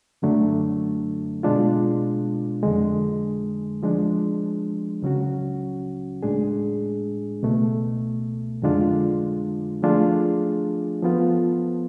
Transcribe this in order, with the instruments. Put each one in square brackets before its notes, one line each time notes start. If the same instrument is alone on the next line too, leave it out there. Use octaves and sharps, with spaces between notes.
[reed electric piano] F#2 D3 F#3 A3 D4
B2 G#3 D4 F4
F2 D3 G#3
F3 G#3 D4
C#2 C#3 F#3 C#4 F#4
A2 G#3 D4 G#4
C#2 B2 A3
F2 D3 G#3 D4 F4
F3 A3 D4 F4 G#4
F3 B3 F4 A4